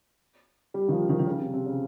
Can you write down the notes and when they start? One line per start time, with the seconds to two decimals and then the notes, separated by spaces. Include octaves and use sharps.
0.74 G3
0.88 D#3
0.92 F3
1.09 D#3
1.19 D#3
1.27 C#3
1.39 C3
1.53 C3
1.66 C#3